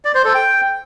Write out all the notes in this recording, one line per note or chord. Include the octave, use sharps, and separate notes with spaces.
D5
C5
A4
G5